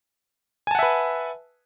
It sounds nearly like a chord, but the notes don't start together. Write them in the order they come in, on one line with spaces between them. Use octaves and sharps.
G#5 A5 F#5 E5 B4